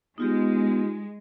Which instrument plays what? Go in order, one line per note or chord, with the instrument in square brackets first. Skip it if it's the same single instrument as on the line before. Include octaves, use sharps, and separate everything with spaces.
[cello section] G#3 [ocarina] B3 [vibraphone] D#4 F4 G4